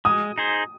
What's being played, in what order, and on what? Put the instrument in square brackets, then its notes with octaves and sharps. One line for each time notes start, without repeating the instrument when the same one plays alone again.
[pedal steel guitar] G#3 [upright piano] D#6
[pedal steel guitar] D#4 G#4 C5